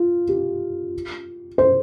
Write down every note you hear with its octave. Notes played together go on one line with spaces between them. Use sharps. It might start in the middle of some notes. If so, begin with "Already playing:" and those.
Already playing: F4
G4
C5